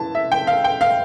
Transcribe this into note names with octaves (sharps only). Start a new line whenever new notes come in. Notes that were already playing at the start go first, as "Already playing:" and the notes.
Already playing: E3 A5
E5
G5
F5
G5
F5